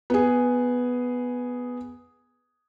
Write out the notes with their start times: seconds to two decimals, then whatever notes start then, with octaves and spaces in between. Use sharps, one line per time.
0.10 B3 G#4